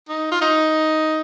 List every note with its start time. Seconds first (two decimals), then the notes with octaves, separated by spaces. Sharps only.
0.09 D#4
0.32 F4
0.41 D#4